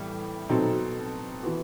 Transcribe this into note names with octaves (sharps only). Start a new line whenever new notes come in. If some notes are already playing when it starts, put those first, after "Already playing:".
Already playing: A2 E3 G3
B2 F#3 C4 D#4 A4
E3 B3 F#4